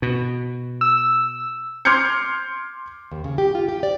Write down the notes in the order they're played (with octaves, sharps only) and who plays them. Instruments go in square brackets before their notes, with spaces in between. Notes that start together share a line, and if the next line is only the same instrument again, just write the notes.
[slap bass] B2
[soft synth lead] E6
[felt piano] C6 D6 F6 G6 G#6 C#7
[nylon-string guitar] D#2
C#3
G4
F4
G4
D5